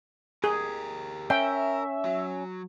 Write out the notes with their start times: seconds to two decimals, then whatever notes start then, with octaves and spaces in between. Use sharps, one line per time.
0.44 G4 G#4 A#4
1.30 C#4 A#4 E5 G5
2.05 F#3